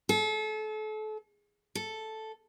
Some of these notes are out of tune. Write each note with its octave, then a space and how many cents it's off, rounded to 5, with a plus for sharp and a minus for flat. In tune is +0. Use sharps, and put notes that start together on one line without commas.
A4 -35
A4 +0